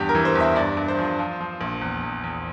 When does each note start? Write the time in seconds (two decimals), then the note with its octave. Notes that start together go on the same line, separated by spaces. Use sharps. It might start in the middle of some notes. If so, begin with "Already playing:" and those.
Already playing: E2 G2 G4
0.09 A#4
0.15 E3
0.25 C5
0.35 E2 E5
0.56 G2 D5
0.77 G2
0.88 C5
0.99 F3
1.19 F3
1.40 F3
1.61 A#1
1.82 E2
2.03 E2
2.24 E2